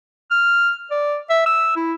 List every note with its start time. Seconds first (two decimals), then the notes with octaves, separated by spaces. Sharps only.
0.31 F6
0.91 D5
1.30 E5
1.46 E6
1.76 E4